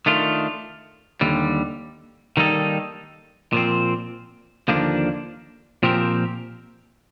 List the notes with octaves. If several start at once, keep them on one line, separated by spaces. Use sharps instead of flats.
D#3 A3 D4 F4
D#2 D3 G3
D#3 G3 A#3 D#4 A4
A#2 F3 C4
D#2 D3 F3 A#3 D4
A#2 F3 C4 G4 A#4